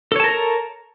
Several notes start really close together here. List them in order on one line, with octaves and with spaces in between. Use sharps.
A4 C#5 A5 A#4 A#5